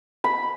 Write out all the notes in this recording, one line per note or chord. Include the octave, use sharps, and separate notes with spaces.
B5